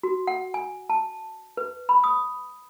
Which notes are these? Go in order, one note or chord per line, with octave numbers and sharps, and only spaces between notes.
F#4
F#5
G#5
A5
B4
B5
D#6